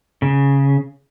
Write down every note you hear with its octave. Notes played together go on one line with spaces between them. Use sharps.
C#3